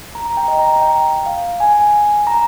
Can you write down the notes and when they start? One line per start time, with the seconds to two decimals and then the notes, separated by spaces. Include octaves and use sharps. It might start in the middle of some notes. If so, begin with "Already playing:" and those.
0.15 A#5
0.26 A#5
0.37 G5
0.48 D#5
0.59 A#5
0.71 A#5
0.82 G5
1.26 F5
1.60 G#5
2.27 A#5